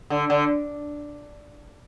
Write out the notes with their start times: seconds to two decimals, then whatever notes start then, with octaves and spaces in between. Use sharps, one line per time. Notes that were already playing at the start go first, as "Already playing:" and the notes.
0.10 D3
0.30 D3